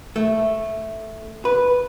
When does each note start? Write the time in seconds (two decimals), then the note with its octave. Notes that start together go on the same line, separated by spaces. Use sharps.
0.16 A3
1.45 B4